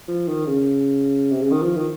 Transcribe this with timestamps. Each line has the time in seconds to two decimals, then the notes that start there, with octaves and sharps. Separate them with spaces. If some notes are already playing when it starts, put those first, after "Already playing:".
0.08 F3
0.28 D#3
0.47 C#3
1.32 C3
1.42 C#3
1.51 D#3
1.62 F3
1.77 D#3